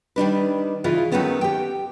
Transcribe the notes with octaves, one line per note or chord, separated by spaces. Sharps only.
D#3 G3 D4 B4
C#3 E3 F4
D#3 F#3 A3 B3 C#4
G4 G5